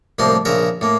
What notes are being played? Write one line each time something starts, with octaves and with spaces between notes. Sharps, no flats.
C2 A2 F3 A#3 C6
A#1 C#3 A#4 E5
A2 A#3